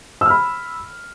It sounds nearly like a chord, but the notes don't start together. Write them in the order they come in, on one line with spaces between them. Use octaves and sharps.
E6 F6 B5